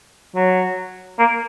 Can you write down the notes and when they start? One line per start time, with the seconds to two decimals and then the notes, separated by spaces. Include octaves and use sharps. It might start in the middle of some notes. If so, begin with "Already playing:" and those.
0.36 F#3
1.19 A#3